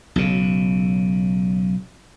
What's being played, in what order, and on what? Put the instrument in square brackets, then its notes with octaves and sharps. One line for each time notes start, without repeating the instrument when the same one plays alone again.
[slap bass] B1 C#3